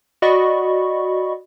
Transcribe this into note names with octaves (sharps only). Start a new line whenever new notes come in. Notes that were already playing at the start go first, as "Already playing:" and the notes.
F#4 D5 D#5 B5 C#6